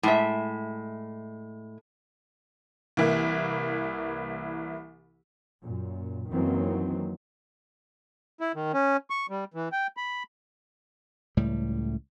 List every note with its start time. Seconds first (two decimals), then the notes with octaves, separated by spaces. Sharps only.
0.03 A2 G#3 E5
2.97 C2 E3 A#3
5.61 F#2 A#2
6.28 F#2 D#3 E3 F#3 A#3 C4
8.41 E4
8.55 D#3
8.74 C#4
9.10 C#6
9.30 G3
9.54 E3
9.72 G5
9.97 B5
11.37 C#2 A2 G3